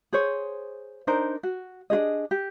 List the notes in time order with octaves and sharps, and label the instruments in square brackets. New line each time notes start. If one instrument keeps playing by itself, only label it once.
[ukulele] G#4 C5 C#5
D4 D#4 A#4 C5
F#4
D4 F4 G#4 D#5
G4